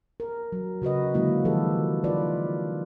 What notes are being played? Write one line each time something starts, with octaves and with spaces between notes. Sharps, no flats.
A#4
F#3
C#3 F#4 B4 D#5
D3 F#3 G#3 A#3 E4
D#3 F3 G4 A4 B4
D#4 F4 B4 D5